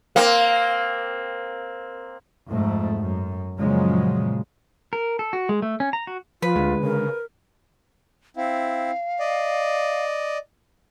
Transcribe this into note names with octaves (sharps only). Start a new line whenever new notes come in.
A#3 C4
F2 G#2 A3
F#2
F#2 A#2 C#3 F3 F#3 G#3
A#4
A4
F#4
G#3
A3
C#4
A#5
F#4
F3 F4 B4
D2 D3 G#3
C#3 A#4
C4 E4 F5
D5 D#5